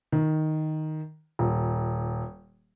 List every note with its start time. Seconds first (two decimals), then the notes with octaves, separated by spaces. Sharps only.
0.12 D#3
1.39 D#1